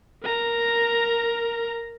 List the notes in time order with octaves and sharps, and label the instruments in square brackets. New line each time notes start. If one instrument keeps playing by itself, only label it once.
[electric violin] A#4 A#5